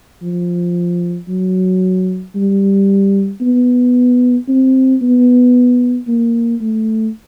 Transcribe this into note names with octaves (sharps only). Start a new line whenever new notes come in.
F3
F#3
G3
B3
C4
B3
A#3
A3